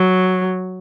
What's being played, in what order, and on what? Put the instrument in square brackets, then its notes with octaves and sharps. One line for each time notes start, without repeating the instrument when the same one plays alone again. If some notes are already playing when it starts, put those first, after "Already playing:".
Already playing: [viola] F#3